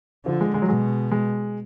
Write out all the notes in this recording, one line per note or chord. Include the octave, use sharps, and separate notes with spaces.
D3 F3
G#3
G#3
F#3
B2 G#3
G#3